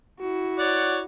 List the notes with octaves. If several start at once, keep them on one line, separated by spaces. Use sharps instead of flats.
E4 F#4
C#5 D5 F#5